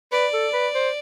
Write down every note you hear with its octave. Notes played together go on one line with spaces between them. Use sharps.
B4 D5
A4
B4
C5